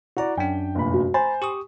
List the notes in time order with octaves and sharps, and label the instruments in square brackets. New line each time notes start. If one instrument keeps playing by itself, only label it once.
[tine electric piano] E4 A#5 [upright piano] F#4 D5
[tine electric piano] F#2 D4 [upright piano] G5
[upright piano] F1 A#2 B5
[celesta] F#4
[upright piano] C5 [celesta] G#5 [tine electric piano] A#5 B5 A6
[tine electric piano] G4 C#6 D#6